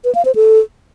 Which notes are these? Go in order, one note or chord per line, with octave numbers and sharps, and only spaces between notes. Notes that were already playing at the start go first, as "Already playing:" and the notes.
B4
F5
C5
A4